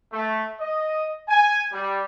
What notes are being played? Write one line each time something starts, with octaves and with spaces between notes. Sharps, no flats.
A3
D#5
G#5
G3